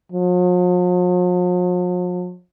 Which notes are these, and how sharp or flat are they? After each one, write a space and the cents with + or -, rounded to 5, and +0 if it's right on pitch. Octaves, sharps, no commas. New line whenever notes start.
F3 +45